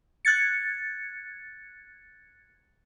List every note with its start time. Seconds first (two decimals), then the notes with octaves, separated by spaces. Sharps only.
0.25 F#6 G#6 A6 C#7